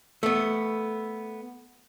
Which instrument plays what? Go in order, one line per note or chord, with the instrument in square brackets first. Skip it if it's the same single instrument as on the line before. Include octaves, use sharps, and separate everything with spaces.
[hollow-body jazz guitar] A3 B3